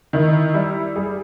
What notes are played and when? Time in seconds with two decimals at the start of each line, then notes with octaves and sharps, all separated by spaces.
0.13 D#3 E4
0.54 G3 E4
0.96 G3 G#4